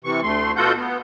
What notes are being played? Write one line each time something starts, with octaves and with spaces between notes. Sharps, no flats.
C3 E3 C#6
D2 A3 C6
B2 F4 F#4 A4 F#5 G6
B3